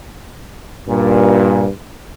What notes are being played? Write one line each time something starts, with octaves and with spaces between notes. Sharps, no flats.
G2 A#2